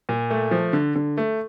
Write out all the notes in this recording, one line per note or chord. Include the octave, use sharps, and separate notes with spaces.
A#2
A3
F3
D3
D3
A3